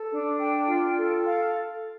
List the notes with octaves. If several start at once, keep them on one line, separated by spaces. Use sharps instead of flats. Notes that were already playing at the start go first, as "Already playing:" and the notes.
Already playing: A4
D4
G5
F4
A4
F5